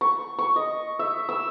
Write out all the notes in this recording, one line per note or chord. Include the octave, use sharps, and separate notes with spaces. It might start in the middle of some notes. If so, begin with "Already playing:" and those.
C#6
C#6
D#5
E5
E6